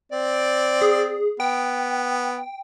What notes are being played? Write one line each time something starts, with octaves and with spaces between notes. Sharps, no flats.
C4 D5
G#4
B3 G5